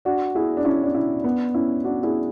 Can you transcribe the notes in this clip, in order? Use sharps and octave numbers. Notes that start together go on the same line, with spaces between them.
D4 F#4
E4 G#4
D4
C#4 E4
D4
C#4 E4
B3 D4
C#4 E4
D4 F#4
E4 G#4